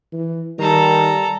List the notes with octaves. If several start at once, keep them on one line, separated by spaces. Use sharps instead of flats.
E3
D#3 G3 A4 A#5